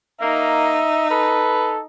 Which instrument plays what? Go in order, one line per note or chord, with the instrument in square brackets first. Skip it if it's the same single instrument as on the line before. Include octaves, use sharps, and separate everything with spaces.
[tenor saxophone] A#3 [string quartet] D#4 [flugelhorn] E5
[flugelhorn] A4 [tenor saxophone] B4